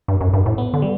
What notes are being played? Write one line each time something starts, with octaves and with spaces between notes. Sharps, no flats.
G2
F#2
G2
A2
B3
D3
G3